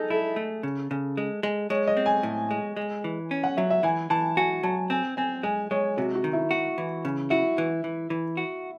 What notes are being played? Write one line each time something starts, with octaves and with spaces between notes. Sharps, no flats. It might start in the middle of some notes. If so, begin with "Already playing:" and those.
Already playing: D#4 G#4 A4
E4 A4
A3
C#3
C#3
G#3
G#3
G#3 C#5
D#5
C4
G#5
A2
G#3
G#3
E3
C#4
F#5
F#3 E5
E5
E3 G#5
E3 A5
F#4 G#5
F#3 A5
C4 G#5
C4 G#5
G#3 G#5
G#3 C#5
C3 F#4
F#4
D#3
E4
F#4
E3
C#3
E4 F#4
E3
E3
E3
F#4